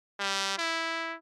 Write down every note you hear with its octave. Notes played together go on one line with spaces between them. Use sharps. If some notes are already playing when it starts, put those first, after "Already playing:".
G3
E4